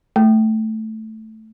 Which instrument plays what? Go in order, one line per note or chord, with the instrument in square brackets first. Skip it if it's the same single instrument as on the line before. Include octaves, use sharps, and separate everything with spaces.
[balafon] A3